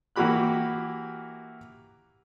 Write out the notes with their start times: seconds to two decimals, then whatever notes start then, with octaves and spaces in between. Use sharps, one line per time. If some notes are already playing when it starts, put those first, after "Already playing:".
0.16 E3 A#3 F#4 G4 B5 F#6